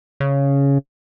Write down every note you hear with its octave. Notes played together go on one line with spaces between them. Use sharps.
C#3